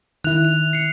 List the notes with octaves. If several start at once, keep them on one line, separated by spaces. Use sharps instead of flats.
D#3 E4 F#6 F7
F7
C7 C#7